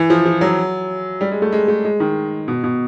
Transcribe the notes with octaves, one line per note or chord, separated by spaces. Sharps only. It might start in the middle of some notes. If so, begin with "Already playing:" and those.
Already playing: E3
F3
F3
F#3
G3
G#3
A3
G#3
A3
G#3
D#3
B2
B2